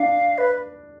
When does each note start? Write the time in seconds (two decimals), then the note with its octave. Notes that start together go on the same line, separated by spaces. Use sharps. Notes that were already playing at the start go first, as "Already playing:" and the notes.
Already playing: D4 F5
0.38 B4